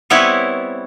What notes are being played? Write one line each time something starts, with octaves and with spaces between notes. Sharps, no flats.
G3 B3 C4 E4 B4 C#5